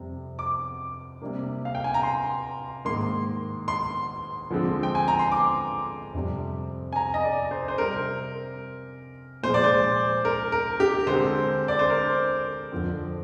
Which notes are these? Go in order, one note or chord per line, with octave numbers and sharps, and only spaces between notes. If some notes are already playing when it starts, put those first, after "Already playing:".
Already playing: F2 C3 G3
D6
C3 G3 A#3
F5
G5
G#5
A#5
C6
G#2 D#3 A#3 C6
C6
D3 F3 G#3 C4
G5
G#5
A#5
C6
D6
F2 C3 G3
G#5
A#5
D#5
D5
C5
C5
C3 G3 C4 A#4
A#2 F3 G#3 C5
D5
C5
A#4
A#4
G4
D3 G#3 C4 C5
D5
C5
A#4
F2 D3 F3 C4